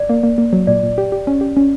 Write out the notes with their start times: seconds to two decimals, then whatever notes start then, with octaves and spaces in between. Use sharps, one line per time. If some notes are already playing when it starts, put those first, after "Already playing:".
Already playing: D5
0.09 A#3
0.23 A#3
0.38 A#3
0.53 F#3
0.67 A#2 D5
0.83 A#2
0.98 G4
1.12 G4
1.27 C#4
1.41 G4
1.57 C#4